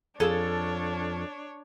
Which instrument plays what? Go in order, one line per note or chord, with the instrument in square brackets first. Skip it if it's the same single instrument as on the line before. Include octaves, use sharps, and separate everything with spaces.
[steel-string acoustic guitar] F2 [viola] D4 C#5 [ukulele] G#4 [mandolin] A4 F5 E6